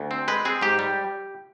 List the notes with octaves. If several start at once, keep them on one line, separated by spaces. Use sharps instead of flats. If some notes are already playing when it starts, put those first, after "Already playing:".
Already playing: D2
C4
G#3 B4
C4 G#4
G#2 G4
G3